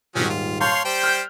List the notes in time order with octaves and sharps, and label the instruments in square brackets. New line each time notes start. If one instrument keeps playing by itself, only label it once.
[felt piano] D#1 G#2 [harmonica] F3 F#3 C#4
[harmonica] F4
[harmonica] C#5 F5 C6 [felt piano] A5 G6
[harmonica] G3 C5 G5
[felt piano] F6 G6